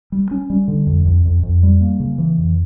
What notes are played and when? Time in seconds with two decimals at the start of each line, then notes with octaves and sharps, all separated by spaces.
0.12 G3
0.31 C#4
0.50 G3
0.68 D3
0.87 F2
1.05 F2
1.25 F2
1.43 F2
1.63 G3
1.81 A#3
2.00 C#3
2.18 E3
2.38 F2